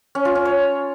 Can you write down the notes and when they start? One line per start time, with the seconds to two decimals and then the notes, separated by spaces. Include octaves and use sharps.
0.15 C#4
0.25 F4
0.35 C#4
0.45 C#5